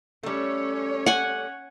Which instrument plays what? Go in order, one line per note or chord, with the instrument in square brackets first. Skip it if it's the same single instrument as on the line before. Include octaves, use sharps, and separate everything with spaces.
[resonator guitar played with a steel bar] G3 A3 [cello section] C#4 C#5
[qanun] F#5 G#5